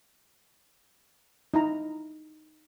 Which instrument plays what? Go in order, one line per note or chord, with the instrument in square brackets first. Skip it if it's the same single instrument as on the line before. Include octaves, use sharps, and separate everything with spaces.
[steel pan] D#4 E4 A#5